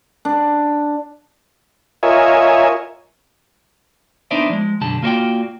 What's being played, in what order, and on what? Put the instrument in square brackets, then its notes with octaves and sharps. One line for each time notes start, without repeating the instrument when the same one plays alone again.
[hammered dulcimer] D4
[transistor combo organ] F4 A#4 C#5 D#5 E5 G#5
[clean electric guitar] B3 D4 D#4 C5 D5 E5
F3 G#3
B1 F#2 D3 G4 A5
A#3 F4 F#4 C#5 D5 G5